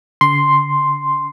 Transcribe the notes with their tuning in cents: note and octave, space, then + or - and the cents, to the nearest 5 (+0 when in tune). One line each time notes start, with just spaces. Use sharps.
D3 -40 C6 +0